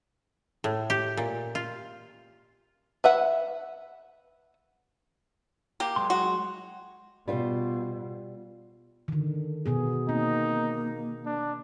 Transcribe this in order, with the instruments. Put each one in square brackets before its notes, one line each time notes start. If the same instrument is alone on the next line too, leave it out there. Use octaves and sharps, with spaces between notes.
[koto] A2
G4
A#2
F4
[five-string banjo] B4 E5 F#5
[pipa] A#3 G4
[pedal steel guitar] F#3 G#3 C6
[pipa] F#4
[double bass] B2 [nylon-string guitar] G3 F4 C5
[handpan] D3 D#3
B2 B3 G#4
[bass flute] A#3 [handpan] C4 [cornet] D#4
[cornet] D4